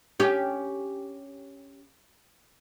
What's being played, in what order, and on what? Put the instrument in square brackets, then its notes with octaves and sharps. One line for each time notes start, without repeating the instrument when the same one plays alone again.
[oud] C#4 G4